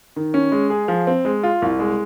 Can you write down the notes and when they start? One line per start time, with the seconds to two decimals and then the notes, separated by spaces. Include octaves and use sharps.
0.16 D#3
0.34 C#4
0.52 G#3
0.70 G#4
0.88 F3
1.07 C4
1.25 G#3
1.43 F4
1.62 C2
1.79 G#3